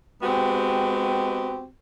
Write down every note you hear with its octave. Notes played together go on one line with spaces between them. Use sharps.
G#3 B3 C4 F#4 G4